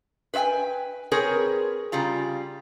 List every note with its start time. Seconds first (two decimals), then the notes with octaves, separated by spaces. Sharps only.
0.34 B4 C5 E5 G5 G#5
1.12 C4 G#4 A#4 B4 C#5
1.92 C#3 G3 F4 A#5